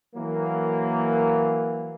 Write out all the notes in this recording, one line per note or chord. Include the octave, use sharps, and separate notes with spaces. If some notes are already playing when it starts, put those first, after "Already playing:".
E3 F#3 A#3